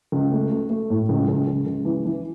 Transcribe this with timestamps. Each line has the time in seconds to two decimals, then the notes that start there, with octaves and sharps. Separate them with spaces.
0.12 C#2
0.32 A3
0.52 A3
0.70 A3
0.90 A2
1.09 C#2
1.28 C#2
1.47 C#2
1.67 C#2
1.85 E3
2.05 E3